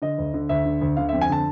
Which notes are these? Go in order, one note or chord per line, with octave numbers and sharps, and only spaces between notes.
D3 D#5
D2
D3
D2 E5
D3
D2
D3 F5
E5
F2
G#5
D3 A5